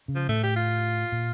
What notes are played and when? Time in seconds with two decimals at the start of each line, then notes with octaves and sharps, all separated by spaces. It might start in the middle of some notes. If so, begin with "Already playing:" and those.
0.08 C#3
0.15 F3
0.28 A2 A3
0.43 G4
0.56 F4
1.12 A#2